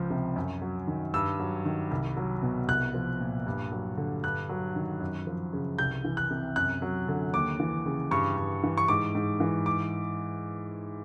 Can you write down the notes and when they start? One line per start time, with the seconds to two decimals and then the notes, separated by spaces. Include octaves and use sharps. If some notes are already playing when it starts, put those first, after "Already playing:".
Already playing: C#2 F3
0.10 C3
0.36 F#2
0.62 F#3
0.87 D#3
1.14 G2 E6
1.40 F#3
1.65 D#3
1.91 C2
2.17 F#3
2.43 B2
2.68 C2 F#6
2.94 F3
3.20 A#2
3.47 G2
3.72 F#3
3.97 D3
4.24 G2 F#6
4.49 F#3
4.76 D#3
5.01 F#2
5.27 F3
5.53 C#3
5.78 C2 G6
6.04 E3
6.17 F#6
6.31 C3
6.56 F#2 F#6
6.82 F#3
7.08 D3
7.34 D#2 D6
7.60 E3
7.86 C#3
8.11 G2 C#6
8.37 G2
8.64 E3
8.78 C#6
8.88 G#2 D6
9.15 G#2
9.40 E3
9.66 D6